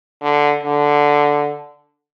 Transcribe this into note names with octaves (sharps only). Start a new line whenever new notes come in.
D3
D3